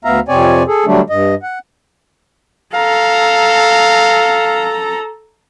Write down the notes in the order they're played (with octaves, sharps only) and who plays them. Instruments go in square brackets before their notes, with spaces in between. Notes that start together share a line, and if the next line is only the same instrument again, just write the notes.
[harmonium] D2 B3 E5 F5 A#5
F2 C3 C4 C#5 D5 G#5
G#4 A4
D3 F#3 G3 A3 D4
G2 D#5
F#5
[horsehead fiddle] A4 A#5 [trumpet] F5